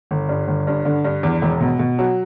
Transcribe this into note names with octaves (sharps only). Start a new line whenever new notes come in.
G1
G2
G1
G2
D3
G2
E2
E1
B2
B2
F#3